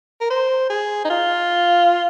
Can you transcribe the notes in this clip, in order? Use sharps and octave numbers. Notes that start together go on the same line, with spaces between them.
A#4
C5
G#4
D#4
F4